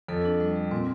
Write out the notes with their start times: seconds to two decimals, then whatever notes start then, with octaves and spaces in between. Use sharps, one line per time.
0.08 F2 A4
0.25 D4
0.40 G3
0.56 G3
0.71 A#2 C4